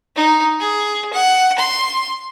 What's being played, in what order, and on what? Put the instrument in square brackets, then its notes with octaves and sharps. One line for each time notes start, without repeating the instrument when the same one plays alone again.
[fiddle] D#4
G#4
F#5
C6